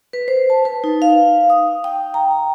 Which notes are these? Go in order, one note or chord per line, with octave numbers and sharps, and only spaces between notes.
B4
C5
A5
B4
D#4
F5
D#6
G5
A#5